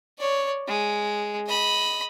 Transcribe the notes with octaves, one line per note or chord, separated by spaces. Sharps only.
C#5 D5
G#3
D#5 B5